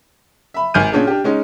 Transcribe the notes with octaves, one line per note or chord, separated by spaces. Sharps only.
E5 B5
G#1 G#5 F6 G6 D#7
A#2 C#4 D4 G#4
D4 G4
G#3 C#4 D#4